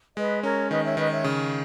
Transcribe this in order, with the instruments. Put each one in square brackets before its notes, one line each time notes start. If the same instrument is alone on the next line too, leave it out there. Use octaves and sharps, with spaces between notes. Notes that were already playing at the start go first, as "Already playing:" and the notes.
[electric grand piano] G#3 [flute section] B4 D#5
[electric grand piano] C#4 [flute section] A#4 C#5
[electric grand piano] D#3 [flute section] B4 D#5
[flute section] C#5 E5
[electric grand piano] D#3 [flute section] B4 D#5
[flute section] C#5 E5
[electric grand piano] C#3